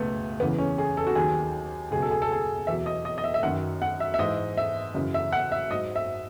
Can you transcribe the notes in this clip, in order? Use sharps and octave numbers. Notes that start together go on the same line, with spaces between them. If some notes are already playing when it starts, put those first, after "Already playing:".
Already playing: C#2 B2 F#3 A3 B3
E2 C#3 E3 B3
C#4
G#4
A4
F#4
D#2 D#3 F#3 G#4
C#2 B2 F#3 G#4
A4
G#4
A4
G#4
E2 B2 F#3 E5
D#5
D#5
D#5
E5
E5
F#2 D#3 F#3 F#5
F#5
E5
E5
G#2 E3 D#5
E5
F#2 C#3 E3
E5
F#5
E5
G#2 F#3 D#5
E5